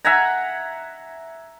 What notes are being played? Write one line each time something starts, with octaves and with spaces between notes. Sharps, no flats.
E5 F#5 G#5 A#5